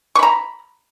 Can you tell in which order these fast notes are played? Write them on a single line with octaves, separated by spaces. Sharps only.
C#6 B5 A#5